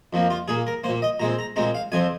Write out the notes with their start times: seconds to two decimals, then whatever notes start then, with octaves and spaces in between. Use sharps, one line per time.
0.13 F2 F3 A#3
0.30 F4
0.48 A#2 A#3 G#4
0.67 A#4
0.84 A#3 C5
0.89 A#2
1.02 D#5
1.20 A#2 G#3 C4 A#5
1.39 A#5
1.56 A#2 G#3 C4 A#5
1.75 F5
1.92 F2 F3 C4 G#5